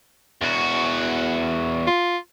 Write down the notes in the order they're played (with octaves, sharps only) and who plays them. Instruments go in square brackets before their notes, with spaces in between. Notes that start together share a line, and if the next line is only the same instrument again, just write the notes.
[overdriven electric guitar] E2 F#4
[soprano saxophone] F4